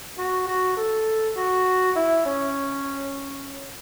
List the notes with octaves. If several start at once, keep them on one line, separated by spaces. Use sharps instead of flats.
F#4
F#4
A4
F#4
E4
C#4